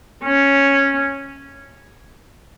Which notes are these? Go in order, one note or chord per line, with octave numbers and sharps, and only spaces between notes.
C#4